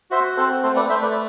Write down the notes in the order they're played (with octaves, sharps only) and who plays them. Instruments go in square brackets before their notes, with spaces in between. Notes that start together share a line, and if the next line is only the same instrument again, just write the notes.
[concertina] F#4 C5 E5
C4 A4 C5
A3 A4 C5
B4 D5
A3 C5 E5
B4 D5